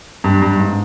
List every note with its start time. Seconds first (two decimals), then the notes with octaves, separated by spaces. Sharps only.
0.24 G2
0.42 G2
0.59 G#2